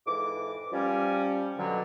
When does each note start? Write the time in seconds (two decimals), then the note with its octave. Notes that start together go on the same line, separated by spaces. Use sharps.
0.06 F2 G#2 E3 D6
0.72 F3 G3 C#4
1.58 B2 D3 F#3